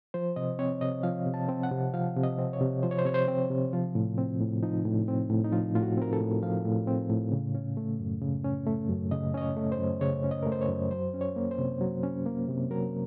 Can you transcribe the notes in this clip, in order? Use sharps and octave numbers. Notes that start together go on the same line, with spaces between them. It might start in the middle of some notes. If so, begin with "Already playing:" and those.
F3 C5
C3 D#5
C4 C#5
C3 D#5
F3 F5
C3
A5
C4
F#5
C3
F3 F5
C3
D#5
C4
C#5
C3
F3 C5
C#5
C5
C3 C#5
C5
C4
C3
F3 F4
A2
C4
A2
F3 D#4
A2
C4
A2
D#4
F3 F4
A2 F4
F#4
C4 A#4
A4
A2
F3 F5
A2
C4
A2
C#3
C#4
A3
F#2
C#3
C#4
A3
F#2
C#3 D#5
C#4 D#5
C#5
A3
C5
F#2
C#3 C#5
C#4
D#5
A3 A#4
C5
C#5
F#2
F#3 C5
C#4
C#5
A#3
C5
C3
F#3
C#4
A#3
C3
F#3 A#4